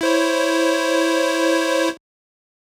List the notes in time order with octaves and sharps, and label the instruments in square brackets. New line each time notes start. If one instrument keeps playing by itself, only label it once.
[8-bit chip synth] E4 C5 C#5